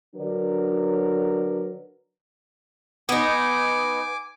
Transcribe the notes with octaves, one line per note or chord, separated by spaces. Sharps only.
D3 F#3 D4 A#4 B4 D5
B3 D#4 G#5 D6